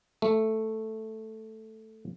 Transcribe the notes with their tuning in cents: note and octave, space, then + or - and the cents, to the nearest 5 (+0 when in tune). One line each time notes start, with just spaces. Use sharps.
A3 +0